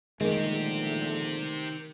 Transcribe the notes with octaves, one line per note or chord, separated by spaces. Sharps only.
A#1 D3 D#3 G#3 A3 C4 G4